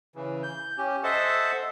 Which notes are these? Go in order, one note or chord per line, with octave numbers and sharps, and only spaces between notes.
C#3 E3
G6
C#4 G4
A4 C5 D#5 E5 F#5 A5